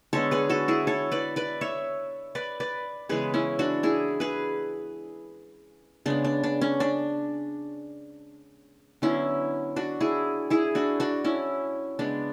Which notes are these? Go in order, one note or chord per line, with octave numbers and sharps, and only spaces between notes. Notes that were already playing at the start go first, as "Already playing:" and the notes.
D3 G#3 B3 A4 C#5
G#4 B4
F#4 A4
E4 G#4
A4 C#5
B4 D5
B4 D5
C#5 E5
B4 D5
B4 D5
C#3 E3 G#3 B3 G#4 B4
C#4 E4
D4 F#4
E4 G#4
G#4 B4
C#3 G#3 B3 D4
D4
D4
C#4
D4
D3 F#3 B3 C#4 E4
D4 F#4
E4 G#4
E4 G#4
D4 F#4
D4 F#4
C#4 E4
C#3 G#3 B3 D4